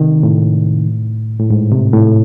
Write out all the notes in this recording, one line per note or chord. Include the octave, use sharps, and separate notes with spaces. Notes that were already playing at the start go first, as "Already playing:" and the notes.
Already playing: C3 D#3
A2
A2
G#2
C3
A2